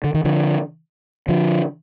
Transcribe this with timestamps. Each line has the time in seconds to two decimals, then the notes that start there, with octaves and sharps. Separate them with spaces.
0.04 D3
0.14 D#3
0.25 D3 F3
1.29 D3 F3